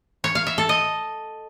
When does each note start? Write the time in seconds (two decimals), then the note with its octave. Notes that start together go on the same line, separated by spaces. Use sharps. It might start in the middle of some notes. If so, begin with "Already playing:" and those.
0.24 C#5
0.35 F5
0.47 E5
0.58 A4
0.69 D#5